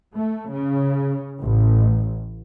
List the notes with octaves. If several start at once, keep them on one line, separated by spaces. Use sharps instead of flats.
A3
C#3
A1